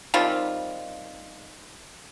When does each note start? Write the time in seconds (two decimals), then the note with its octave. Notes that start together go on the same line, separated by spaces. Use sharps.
0.14 D#3 G3 C4 F4